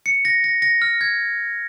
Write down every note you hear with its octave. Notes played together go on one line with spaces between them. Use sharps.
C#7
A#6
A#6
A#6
F6
G#6